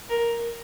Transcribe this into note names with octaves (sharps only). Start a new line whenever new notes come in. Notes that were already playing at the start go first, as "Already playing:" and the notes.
A#4